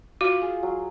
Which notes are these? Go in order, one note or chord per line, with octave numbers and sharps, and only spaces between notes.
F4 F#4
G#4
F#3